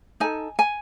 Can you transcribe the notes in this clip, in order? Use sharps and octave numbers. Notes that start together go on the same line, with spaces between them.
D#4 A4 G#5
G#5